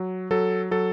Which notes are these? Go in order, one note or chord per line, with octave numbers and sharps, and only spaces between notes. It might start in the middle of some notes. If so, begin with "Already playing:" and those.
Already playing: F#3
F#3 A4
F#3 A4